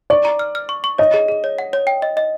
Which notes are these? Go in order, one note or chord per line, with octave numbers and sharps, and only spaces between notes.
D5 C#6
A#5
F6
F6
C#6
C#6
C#5 D#5
G#4
G#4
C#5
F#5
C#5
G5
D#5
D#5